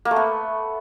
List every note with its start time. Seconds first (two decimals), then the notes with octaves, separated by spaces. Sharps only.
0.05 A#3
0.11 A3
0.16 B3